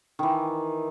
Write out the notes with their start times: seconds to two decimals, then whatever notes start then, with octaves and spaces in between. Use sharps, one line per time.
0.19 D#3 E3